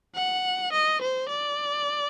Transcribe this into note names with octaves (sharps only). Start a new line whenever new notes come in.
F#5
D#5
C5
D5